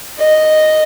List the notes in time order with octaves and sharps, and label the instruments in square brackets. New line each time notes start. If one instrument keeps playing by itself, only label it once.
[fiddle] D#5